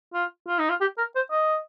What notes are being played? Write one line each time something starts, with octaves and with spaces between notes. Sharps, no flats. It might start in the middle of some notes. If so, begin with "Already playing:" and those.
F4
F4
D#4
F4
G4
A#4
C5
D#5